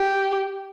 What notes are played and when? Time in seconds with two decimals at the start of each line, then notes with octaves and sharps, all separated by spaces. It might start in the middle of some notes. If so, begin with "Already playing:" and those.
Already playing: G4